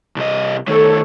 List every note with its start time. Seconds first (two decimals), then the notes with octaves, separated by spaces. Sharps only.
0.16 C2 D#5
0.68 D#3 A3 A4 C#5